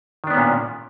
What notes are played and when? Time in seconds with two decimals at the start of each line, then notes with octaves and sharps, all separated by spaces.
0.24 D#3
0.27 D4
0.30 B3
0.34 C#4
0.37 A#2